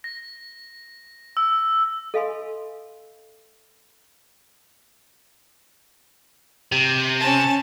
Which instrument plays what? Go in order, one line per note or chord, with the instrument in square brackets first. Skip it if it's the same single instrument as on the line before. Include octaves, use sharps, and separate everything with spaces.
[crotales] A#6
E6
[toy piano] A4 D#5 F5 G#5 B5 C6
[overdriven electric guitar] C3
[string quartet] C#4 A5